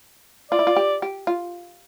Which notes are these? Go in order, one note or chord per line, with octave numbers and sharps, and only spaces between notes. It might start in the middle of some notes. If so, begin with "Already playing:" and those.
F4 D5
E4
F4
G4
G4
F4